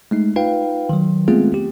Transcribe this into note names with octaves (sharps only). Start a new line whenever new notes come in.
G#3 A3 D#4
D#4 F4 B4 F5 G5
D#3 F#3
G#3 A3 B3 C4 F4 G#4
G4